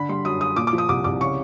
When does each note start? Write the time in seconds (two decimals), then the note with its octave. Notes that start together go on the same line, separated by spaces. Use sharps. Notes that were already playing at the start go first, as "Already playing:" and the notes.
Already playing: D3 B5
0.09 G3 C6
0.25 F#2 D#6
0.40 F#2 D#6
0.56 A#2 D6
0.67 D6
0.73 F3
0.78 D#6
0.89 C2 D6
1.04 C2 D6
1.20 C#3 C#6